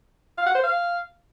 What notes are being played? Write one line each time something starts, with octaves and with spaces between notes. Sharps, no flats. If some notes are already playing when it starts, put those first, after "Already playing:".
F5
F#5
C5
F5